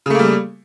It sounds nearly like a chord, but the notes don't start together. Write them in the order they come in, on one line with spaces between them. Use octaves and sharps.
C#3 A3 A#3 G3